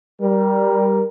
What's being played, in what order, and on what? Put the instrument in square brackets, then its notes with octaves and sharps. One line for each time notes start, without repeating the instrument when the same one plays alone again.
[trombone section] G3 A#4